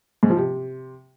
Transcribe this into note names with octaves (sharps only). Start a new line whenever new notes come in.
G#2
F3
C3